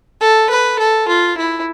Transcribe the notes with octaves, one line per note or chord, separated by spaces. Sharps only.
A4
B4
A4
F4
E4